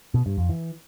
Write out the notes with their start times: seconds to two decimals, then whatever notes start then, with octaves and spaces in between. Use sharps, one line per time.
0.14 B2
0.26 G2
0.38 F2
0.49 E3